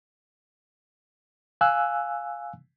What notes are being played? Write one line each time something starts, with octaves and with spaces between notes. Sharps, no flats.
F5 G#5 E6 F#6